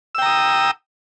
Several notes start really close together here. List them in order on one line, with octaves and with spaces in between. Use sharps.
E6 G5 A#5 D#6